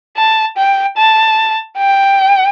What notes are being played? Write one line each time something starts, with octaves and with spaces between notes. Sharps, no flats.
A5
G5
A5
G5